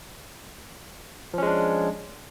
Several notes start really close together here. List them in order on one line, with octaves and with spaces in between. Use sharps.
F3 C#4 G#3 D4